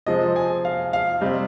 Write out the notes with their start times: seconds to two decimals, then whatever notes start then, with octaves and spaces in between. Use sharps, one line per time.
0.06 C3 F3 G#3 C4 D#5
0.36 G#5
0.65 F5
0.93 F5
1.21 C3 G3 C4 D#5